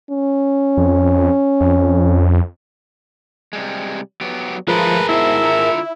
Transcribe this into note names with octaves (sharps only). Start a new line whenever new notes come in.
C#4
F2
F2
C3 G3 G#3
F#3 B3 G4
F3 G#3 A3 G#4 A#4 B4
G#2 B2 E4 C5 E5
D3 F4 A#5